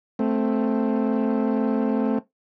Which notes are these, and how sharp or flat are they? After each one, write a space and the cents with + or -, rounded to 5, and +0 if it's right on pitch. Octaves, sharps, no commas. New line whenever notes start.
A3 +0 C4 +0